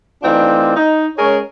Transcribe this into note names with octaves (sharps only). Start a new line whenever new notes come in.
E3 A3 C4 D4 D#4 F4
D#4
G#3 C#4 G#4 A#4 C#5